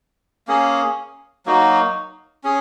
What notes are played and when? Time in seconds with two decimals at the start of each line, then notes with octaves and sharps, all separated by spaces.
0.48 A#3 C#4 G#4
1.46 F#3 A#3 D#4 F#4
2.44 C#4 G#4